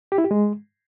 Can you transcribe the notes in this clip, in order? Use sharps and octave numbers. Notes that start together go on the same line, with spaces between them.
G4
E4
G4
G#3